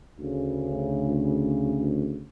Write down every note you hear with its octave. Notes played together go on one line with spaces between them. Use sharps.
D2 C#3